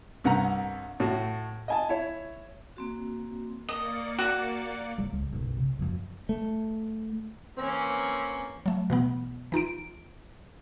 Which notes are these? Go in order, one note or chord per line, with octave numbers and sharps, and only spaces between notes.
C2 G2 F#5 A#5
A2 A3 F#4
D#5 G#5 A5
E4 C#5
A#3 C4 F#4
A#3 A#4 D5 D#5 C#7
F#4
F#3
C#2
B1 F#2
C3
F#2 F3
A3
E3 A#3 C4 C#4
F#3 A3
B2 E3 B3
E3 D#4 F4 D7